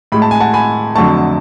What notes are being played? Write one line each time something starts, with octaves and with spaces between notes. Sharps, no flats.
A2 G#3 B5
A5
G#5
F#5 A5
G#5 B5
F2 D3 F#3 A3 A5 C#6